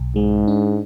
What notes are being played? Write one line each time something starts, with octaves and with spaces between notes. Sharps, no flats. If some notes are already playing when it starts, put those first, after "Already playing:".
Already playing: B1
G#2 G#3
D4